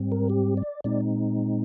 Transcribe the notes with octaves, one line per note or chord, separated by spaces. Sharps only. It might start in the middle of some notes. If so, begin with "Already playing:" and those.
Already playing: G#2 G3 C4
A#4
G4
D5
A#2 G#3 C4 D#4 D5